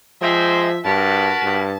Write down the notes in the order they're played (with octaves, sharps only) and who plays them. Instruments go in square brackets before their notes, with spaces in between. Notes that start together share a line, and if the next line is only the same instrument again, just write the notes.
[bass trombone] F3 [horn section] G#3 C4 C5 [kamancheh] E5
[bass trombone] G2 [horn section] F#4 A#4 B5 [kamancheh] A5
[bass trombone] G2